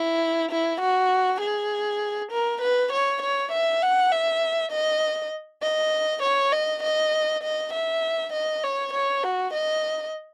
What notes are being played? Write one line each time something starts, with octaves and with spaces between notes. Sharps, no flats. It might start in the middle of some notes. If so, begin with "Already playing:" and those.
Already playing: E4
E4
F#4
G#4
A#4
B4
C#5
C#5
E5
F#5
E5
D#5
D#5
C#5
D#5
D#5
D#5
E5
D#5
C#5
C#5
F#4
D#5